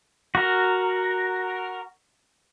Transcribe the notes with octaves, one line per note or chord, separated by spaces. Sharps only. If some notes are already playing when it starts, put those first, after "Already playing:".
F#4 A#4